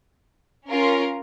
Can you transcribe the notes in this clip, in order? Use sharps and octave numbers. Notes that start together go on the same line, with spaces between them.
C#4 F4 A#4